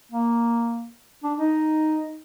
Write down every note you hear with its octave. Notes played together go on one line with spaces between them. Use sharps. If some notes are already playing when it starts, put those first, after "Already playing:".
A#3
D4
D#4